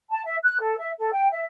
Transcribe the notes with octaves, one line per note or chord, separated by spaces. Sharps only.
A5
E5
F#6
A4
E5
A4
G5
E5